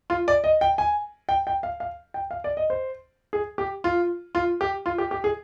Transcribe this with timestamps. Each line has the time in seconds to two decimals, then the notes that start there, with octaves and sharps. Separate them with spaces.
0.10 F4
0.28 D5
0.44 D#5
0.61 G5
0.78 G#5
1.29 G5
1.47 G5
1.63 F5
1.80 F5
2.14 G5
2.31 F5
2.44 D5
2.57 D#5
2.70 C5
3.33 G#4
3.58 G4
3.84 F4
4.35 F4
4.61 G4
4.86 F4
4.98 G4
5.11 G4
5.24 G#4